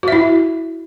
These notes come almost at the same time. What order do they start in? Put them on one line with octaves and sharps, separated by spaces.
F#4 E5 E4